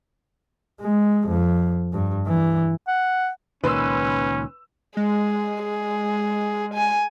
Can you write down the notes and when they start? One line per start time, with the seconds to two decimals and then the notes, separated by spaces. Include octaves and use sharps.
0.81 G#3
1.29 F2
1.93 G2
2.27 E3
2.88 F#5
3.64 C#2 A#2 D#3 C#4 B4 C6 E6
4.97 G#3 G#4
5.63 G#4
6.74 G#5